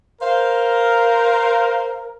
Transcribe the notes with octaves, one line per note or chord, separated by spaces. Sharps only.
A#4 C5 F5